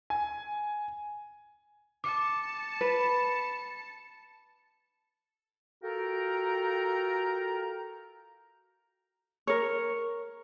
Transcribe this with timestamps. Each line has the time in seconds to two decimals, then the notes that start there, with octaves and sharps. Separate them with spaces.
0.10 G#5
2.04 A5 D6 C#7
2.81 B4
5.83 F4 F#4 A4 A#4 G5 A#5
9.47 A#4 C#5